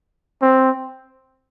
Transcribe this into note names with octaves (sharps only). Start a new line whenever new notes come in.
C4